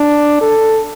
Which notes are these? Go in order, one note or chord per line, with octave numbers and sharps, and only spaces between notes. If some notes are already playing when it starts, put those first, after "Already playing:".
Already playing: D4
A4